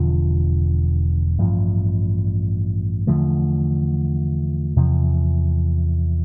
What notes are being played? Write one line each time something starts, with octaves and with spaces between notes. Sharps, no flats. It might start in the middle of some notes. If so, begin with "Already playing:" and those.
Already playing: E1 E2 D3 F3
A1 G2 F3
E2 D3 F3 A3
E2 C3 F3